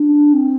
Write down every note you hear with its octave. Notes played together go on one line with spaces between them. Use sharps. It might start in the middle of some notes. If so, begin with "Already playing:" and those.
Already playing: D4
C4